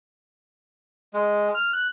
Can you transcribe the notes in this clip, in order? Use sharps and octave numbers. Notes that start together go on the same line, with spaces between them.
G#3
F6
F#6